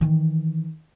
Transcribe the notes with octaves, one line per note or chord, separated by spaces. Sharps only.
D#3 E3